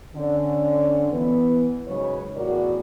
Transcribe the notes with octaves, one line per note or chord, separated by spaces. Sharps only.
D3 C#4
E3 B3 B4
G#2 C#3 F#3 B4 C#5
E2 A2 F#4 G#4 A#4 D5